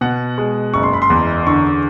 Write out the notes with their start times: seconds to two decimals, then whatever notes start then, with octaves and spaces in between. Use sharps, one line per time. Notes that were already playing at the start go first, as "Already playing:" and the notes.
0.01 B2 F#5
0.38 G#3
0.74 F#1 C#6
0.83 C6
0.93 B5
1.02 C6
1.10 E2
1.47 D3 C#6